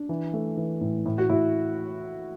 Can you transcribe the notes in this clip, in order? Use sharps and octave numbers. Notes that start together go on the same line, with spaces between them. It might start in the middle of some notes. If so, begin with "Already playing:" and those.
Already playing: D4
E3
A3
E3
A2
A2
F#4
A2 E4